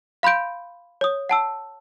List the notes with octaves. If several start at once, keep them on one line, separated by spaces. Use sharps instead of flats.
F5 B5 C6 G6 D7
C#5 D#6
F#5 A5 E6